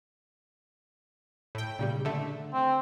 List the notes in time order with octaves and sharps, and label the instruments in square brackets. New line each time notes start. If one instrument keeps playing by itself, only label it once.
[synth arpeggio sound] A2 G5
A#2 C#3 G3
D3 A3
[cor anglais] C4